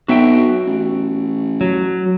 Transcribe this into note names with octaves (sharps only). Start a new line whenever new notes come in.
B1 F#4 E5 G5
A1
F#3